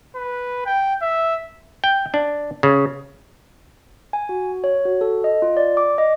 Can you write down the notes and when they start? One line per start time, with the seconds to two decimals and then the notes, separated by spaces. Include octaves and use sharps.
0.16 B4
0.66 G5
1.02 E5
1.84 G5
2.14 D4
2.63 C#3
4.13 G#5
4.29 F#4
4.64 C#5
4.85 F#4
5.01 A4
5.24 D#5
5.42 F4
5.57 D5
5.77 D6
5.98 D#5